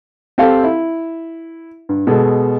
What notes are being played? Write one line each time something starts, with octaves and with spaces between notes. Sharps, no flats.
C4 G4 A4 F5
E4
G2
B2 G#3 A4